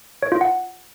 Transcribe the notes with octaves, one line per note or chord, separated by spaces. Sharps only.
C#5
F4
F#5